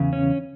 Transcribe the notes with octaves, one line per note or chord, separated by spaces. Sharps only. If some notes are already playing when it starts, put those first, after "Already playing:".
Already playing: E2 C#3
C#4